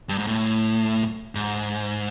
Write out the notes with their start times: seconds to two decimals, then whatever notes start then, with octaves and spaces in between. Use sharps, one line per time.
0.09 G2
0.18 G#2
0.27 A2
1.35 G#2